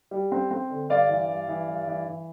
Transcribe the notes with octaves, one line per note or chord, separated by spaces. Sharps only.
G3
C4
C4
D3
G2 D5 F5
E3
G2
E3
G2
E3
E3